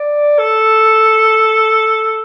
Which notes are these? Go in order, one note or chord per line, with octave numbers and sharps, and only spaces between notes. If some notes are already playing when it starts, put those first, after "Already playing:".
Already playing: D5
A4